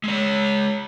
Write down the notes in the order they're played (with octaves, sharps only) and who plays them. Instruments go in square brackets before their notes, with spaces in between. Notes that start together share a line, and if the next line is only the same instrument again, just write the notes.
[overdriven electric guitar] G#3 C#5